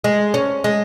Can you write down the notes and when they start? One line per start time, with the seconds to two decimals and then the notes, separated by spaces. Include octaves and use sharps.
0.04 G#3
0.34 C#4
0.64 G#3